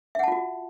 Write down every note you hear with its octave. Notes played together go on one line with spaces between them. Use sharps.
F4 F#4 E5 F#5 A5